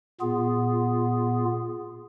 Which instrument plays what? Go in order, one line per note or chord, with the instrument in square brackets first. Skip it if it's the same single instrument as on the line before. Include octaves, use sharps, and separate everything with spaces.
[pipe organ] A#2 B3 F4 G#4